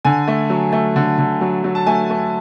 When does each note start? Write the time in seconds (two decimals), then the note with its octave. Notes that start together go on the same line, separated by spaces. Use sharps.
0.05 D3 G#5
0.28 A3
0.50 F#3
0.73 A3
0.96 D3
1.19 D3
1.41 F#3
1.64 F#3
1.75 A5
1.87 A3 G#5
2.10 A3